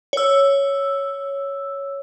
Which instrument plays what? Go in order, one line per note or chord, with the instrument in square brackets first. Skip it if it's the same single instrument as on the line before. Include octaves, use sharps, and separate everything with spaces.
[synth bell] C#5 E6